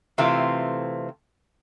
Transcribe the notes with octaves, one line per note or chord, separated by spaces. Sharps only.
C3 E3 A3 C4 F4